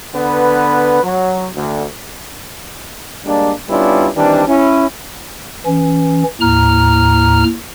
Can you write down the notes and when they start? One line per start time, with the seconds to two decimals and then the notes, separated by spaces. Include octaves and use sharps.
0.15 D3 B3 B4
1.03 F#3
1.54 D2
3.26 G3 G#3 A#3 D4
3.69 G3 B3 C#4 D4 E4 F4
4.16 D#3 E3 G3 C4 D4
4.47 C#4 E4
5.66 E3 C#4
6.41 D#2 A2 A#5 F6